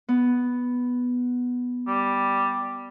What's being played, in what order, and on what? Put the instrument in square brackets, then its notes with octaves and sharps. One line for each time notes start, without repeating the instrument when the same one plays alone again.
[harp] B3
[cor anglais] G3